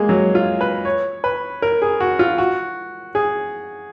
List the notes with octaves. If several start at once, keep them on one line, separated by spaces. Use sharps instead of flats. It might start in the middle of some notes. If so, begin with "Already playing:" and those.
Already playing: G#3 A#3
F#3
F4
B4
C#5
B4
A#4
G#4
F#4
F4
F#4
G#4